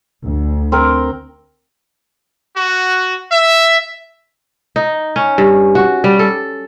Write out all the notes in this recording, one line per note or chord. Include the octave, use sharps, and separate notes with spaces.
D2
C4 A#4
F#4
E5
D#4
C#4
G2
F#4
G3
A4